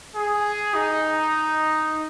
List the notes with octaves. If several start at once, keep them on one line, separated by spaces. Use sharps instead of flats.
G#4
D#4